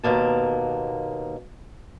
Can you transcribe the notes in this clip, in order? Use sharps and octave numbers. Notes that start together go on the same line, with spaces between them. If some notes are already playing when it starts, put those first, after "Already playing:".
D#2 B2 A#3 A5